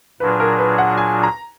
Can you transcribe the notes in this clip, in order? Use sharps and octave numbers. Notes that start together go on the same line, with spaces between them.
A#2 F#3 D4 F4 G#4 B4
A#4
B4
F#5
G#5
A#5